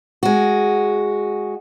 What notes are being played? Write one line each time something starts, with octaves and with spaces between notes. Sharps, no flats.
G#3 F#4